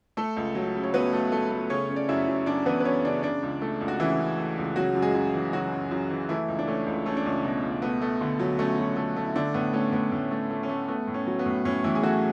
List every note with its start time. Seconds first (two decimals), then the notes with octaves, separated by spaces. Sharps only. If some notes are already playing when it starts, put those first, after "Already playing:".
0.17 A3 A4
0.37 C#2
0.55 F#3
0.75 C#3
0.84 C#5
0.94 F#3 B3 B4
1.13 A3
1.32 A3
1.51 A3
1.70 C#3 C#4 C#5
1.89 C#3
1.96 D5
2.09 F#2 E4 E5
2.28 F#2
2.46 F#2 D4 D5
2.66 E3 B3 B4
2.80 B4
2.85 F#2 C#4 C#5
3.05 C#3 D4 D5
3.23 C#3 D4 D5
3.43 C#2
3.62 A3
3.81 C#2
3.88 F#4
4.00 C#3 E3 E4
4.19 C#3
4.38 A3
4.58 C#2
4.76 C#3 F#3 F#4
4.95 F#2
5.02 G#3 G#4
5.15 F#2
5.34 E3
5.53 C#3 F#3 F#4
5.72 F#2
5.91 F#2
6.10 E3
6.29 E3 A3 E4
6.48 C#2
6.59 D4
6.67 A3 C#4
6.86 C#2
7.06 A3 C#4
7.17 D4
7.25 C#2 C#4
7.45 B2
7.63 C#2
7.82 A3 B3
8.02 A3
8.21 D3
8.39 F#3
8.59 A3 C#4
8.79 F#3
8.97 A3
9.16 A3
9.24 E4
9.35 D3 A3 D4
9.54 A2 B3
9.73 A3 C#4
9.92 A2 B3
10.12 A2 C#4
10.31 A3
10.51 A3
10.63 C#4
10.69 A3
10.88 A3 B3
11.07 A2
11.14 C#4
11.27 F#3
11.39 B3
11.46 A2
11.65 A2 C#4
11.84 A2 E3 E4
11.95 G#4
12.03 F#3 A3 F#4